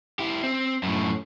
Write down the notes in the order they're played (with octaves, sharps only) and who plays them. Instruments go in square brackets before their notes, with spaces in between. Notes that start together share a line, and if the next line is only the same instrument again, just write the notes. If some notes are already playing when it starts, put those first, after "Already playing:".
[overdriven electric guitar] E4 G4
C4
F#2 A2